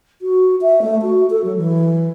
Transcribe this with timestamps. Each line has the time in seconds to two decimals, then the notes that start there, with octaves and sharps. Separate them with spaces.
0.22 F#4
0.62 E5
0.82 A3
1.02 F#4
1.30 A4
1.44 F#3
1.57 E3